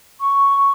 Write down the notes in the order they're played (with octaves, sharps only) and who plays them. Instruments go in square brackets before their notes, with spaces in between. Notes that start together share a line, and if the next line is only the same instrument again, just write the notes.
[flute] C#6